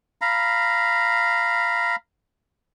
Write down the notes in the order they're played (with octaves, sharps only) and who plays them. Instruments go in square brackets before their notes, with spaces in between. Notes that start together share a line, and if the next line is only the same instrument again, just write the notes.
[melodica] F5 A#5 B5